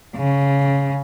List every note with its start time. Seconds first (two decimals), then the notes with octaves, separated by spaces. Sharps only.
0.17 C#3